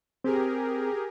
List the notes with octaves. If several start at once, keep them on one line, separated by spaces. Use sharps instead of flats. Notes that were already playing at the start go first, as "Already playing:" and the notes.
C4 G4 G#4 A#4